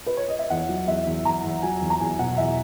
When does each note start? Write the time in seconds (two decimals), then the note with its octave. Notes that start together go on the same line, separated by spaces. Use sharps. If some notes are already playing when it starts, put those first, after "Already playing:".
0.06 B4
0.17 C#5
0.28 D#5
0.39 E5
0.50 E2 F#5
0.69 F#3
0.87 E2 E5
1.07 E2
1.25 E2 A#5
1.44 E2
1.62 F#3 G#5
1.81 E2
1.90 A#5
2.00 E2 G#5
2.19 B2 F#5
2.37 E2 E5